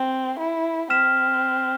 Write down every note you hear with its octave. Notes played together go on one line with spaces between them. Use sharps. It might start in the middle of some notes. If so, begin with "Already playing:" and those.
Already playing: C4
E4
C4 F6 B6 E7